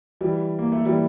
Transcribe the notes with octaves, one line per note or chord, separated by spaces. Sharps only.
E3 G3
A#3
A3
E3 G3